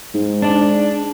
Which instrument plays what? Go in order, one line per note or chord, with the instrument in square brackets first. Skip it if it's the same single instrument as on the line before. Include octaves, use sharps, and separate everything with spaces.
[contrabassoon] G#2
[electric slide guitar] D4 D5